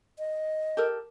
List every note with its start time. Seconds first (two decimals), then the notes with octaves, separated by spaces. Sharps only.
0.19 D#5
0.77 G4 A4 A#4